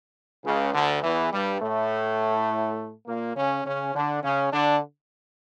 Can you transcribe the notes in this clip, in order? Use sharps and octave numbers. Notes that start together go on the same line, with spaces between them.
C#2 C#3
D2 D3
E2 E3
G2 G3
A2 A3
A#2 A#3
C#3 C#4
C#3 C#4
D3 D4
C#3 C#4
D3 D4